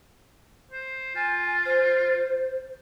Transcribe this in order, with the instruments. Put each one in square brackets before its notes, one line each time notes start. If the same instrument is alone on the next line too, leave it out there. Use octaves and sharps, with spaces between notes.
[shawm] C5
[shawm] F4 [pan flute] G#5
[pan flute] C5